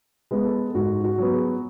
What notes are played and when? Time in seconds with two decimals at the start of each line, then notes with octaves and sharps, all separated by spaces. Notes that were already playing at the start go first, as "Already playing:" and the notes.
0.31 G#3 B3
0.45 A4
0.74 G#2 F#4
1.04 F#4
1.18 F#3 B3
1.33 G#4